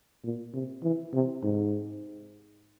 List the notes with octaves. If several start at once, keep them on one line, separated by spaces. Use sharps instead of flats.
A#2
C3
E3
C3
G#2